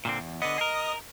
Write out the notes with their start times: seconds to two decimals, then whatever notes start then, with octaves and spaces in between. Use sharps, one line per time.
0.05 A#2 D3 C4
0.19 E2
0.42 D3 B3 D#5 D#6
0.58 G#4 A#4